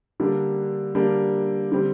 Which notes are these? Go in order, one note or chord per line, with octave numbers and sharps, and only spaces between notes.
D3 G3 A#3 D4
D3 G3 A#3 D4
D3 G3 C4